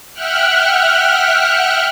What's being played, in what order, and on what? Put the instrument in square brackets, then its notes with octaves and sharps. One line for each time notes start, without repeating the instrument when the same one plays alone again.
[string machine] E5 F#5 G5 F6 F#6